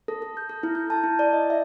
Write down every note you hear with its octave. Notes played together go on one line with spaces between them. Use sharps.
A4
A4
G6
A4
E4
G6
A5
E4
D5
D#5
E5